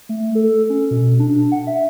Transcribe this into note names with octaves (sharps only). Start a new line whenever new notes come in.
A3
A4
C#4
B2
D4
F#5
E5